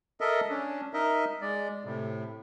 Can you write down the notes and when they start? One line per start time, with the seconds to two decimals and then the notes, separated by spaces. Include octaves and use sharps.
0.21 A4 A#4 D#5 E5
0.50 C#4 D4
0.94 D#4 A#4 D#5 E5
1.41 G#3 D5
1.85 A2 C3